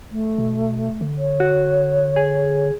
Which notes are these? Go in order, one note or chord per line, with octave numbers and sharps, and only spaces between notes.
A3
B2
D3
C#5
F#4
G#4